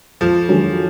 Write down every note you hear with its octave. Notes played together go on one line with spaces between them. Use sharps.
F2 F3
D#3 F#3 D4 G#4